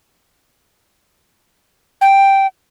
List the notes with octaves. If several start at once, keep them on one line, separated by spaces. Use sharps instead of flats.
G5